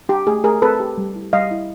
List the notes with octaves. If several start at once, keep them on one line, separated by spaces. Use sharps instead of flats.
D4 G4
A3 G#4
A3 G#4 A#4
C4 A4 B4
G4
G3
E4
G3 D#5 F5
E4